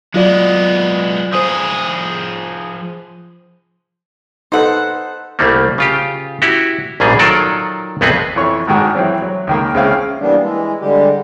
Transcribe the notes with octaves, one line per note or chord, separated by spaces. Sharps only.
F#3 G#3 B3 F4 D5
F3 G#4 C5 D#6
D#4 A4 B4 C5 F#5
C2 G3 A3 A#3
C#3 F4 G4
E4 F#4 G4
A#1 G#2 B2 G3 G#4
D#3 F#3 F4 A4 A#4 D5
A#1 F2 B3 C4 G#4 B4
F2 E3 C#5 C#6
G#1 G#2 D#3 F#4
E3 F#3 C4
F#3
C#2 D#3 A#3
C#2 C#3 C4 C#4 E4 F5
E3 G3 A#3 B3 D4
E3 G#3
D3 G3 G#3 G4